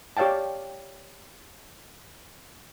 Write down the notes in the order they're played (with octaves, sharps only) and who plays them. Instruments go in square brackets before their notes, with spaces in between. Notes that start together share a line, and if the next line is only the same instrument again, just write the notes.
[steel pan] G4 C#5 D5 F5 G5 A5